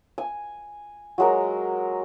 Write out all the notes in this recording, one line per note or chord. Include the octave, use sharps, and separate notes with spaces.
G#5
F#3 G#3 A#4